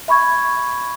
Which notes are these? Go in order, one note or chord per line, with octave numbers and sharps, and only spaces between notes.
E5 B5 C#6 G#6